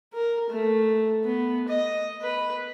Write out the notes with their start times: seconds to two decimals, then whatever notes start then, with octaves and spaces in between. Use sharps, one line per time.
0.13 A#4
0.50 A3
1.25 B3
1.68 D#5
2.22 B4